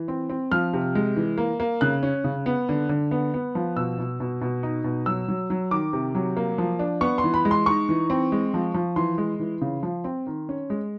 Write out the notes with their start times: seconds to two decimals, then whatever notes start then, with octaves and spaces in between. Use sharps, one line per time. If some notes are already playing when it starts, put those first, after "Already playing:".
Already playing: E3
0.08 C4
0.29 C4
0.52 F3 F6
0.73 C3
0.95 G#3
1.16 E3
1.38 A#3
1.60 A#3
1.81 C#3 F#6
2.03 C#4
2.24 C#3
2.46 B3
2.69 D3
2.89 D3
3.11 B3
3.34 B3
3.55 F3
3.76 B2 E6
3.99 B2
4.20 B2
4.41 B2
4.63 D#4
4.84 B2
5.06 F#3 E6
5.28 F#3
5.50 F#3
5.71 D#3 D6
5.93 C3
6.15 F#3
6.37 A#3
6.58 F3
6.79 D4
7.01 B3 C#6
7.18 C6
7.24 E3
7.34 B5
7.45 G#3
7.51 C6
7.66 D#4 C#6
7.89 E3
8.10 C4
8.32 G#3
8.54 F3
8.74 F3
8.96 E3 C6
9.18 G#3
9.40 E3
9.61 C#3
9.83 F3
10.04 C4
10.27 D#3
10.49 C#4
10.70 G#3